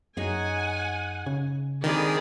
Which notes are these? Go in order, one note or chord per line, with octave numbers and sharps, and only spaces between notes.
F#2 D#4 G#4 C#5 F#5 G#5
C#3 G#5
D#3 G#3 C4 D4 G#4 D5 B5